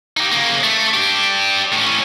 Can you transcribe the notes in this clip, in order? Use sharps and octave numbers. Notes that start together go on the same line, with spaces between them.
D#4 G4
C#3 A#3
A3
D4 G4
A2 C#4